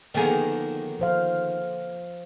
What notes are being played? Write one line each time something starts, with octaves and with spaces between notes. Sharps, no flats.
F2 D3 D#3 A#3 B3 G#4
F3 C5 F5